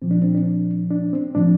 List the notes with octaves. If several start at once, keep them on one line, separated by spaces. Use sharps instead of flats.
A#2 F3 C4
D4
C4
D4
D4
C4
A2 F3 D4